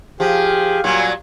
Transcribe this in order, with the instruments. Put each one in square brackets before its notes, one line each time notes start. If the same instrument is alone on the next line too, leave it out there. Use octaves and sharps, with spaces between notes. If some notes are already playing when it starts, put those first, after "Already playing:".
[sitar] F3 [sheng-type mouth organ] G4 G#4
[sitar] A#2 F#3 G3 [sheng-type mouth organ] G#5